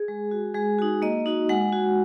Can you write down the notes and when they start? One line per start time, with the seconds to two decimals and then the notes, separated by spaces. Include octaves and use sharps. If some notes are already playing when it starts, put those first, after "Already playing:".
Already playing: G#4
0.08 G#3
0.31 F#4
0.54 G#3 G#4
0.79 D#4 F#4
1.02 A#3 D#5
1.26 D#4 F#4
1.49 G#3 F#5
1.72 F#4